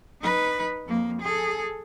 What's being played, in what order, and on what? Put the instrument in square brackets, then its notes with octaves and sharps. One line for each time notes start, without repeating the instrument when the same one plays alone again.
[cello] D#4 B4
F2 A#3
G#4 A4